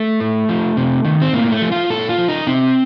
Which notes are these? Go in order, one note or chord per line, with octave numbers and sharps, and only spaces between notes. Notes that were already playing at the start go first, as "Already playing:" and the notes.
Already playing: A3
A2
F3
C3
D#3
C4
A2 A#3
A3
F3
F4
A#2 A4
F4
F3
D#4
C3 C4